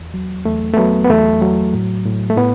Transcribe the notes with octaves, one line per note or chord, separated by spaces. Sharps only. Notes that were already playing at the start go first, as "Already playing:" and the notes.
Already playing: E2
F#3
E2 A3
A3
F#3 B3
B3
E2 A3
F#3
A2
A2
A3
A2 B3